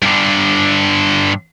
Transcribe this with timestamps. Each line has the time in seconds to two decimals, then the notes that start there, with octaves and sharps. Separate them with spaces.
0.02 G2 D3